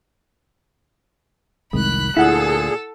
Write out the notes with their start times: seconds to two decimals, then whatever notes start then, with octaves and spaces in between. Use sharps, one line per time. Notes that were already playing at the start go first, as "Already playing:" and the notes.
1.73 F1 C2 D#3 G#3 B5 F#6
2.17 D2 A#2 E4 G#4 A4 F#5 F#6